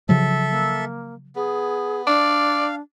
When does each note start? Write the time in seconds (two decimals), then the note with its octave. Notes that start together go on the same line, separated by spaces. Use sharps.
0.09 C#3 F3 F#3 A4 E5
0.50 A#3
1.36 B3 G#4
2.07 D4 D5 F5